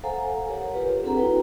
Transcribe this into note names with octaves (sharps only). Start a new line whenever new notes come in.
A4 C5 F5 F#5 G#5 A#5
G4 A#4 C#5 F#5
F4 G4 A4 B4
C4 D4 G#4 A4 F#5 A#5
E4 F#4 B4 G5